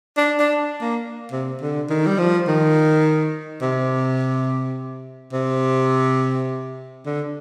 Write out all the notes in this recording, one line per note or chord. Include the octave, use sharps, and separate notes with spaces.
D4
D4
A#3
C3
D3
D#3
G3
F3
D#3
C3
C3
D3